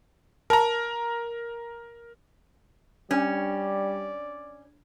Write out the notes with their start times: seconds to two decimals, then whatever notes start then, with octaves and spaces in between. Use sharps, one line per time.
0.50 A#4 A5 A#5
3.11 G3 C#4 D4 D5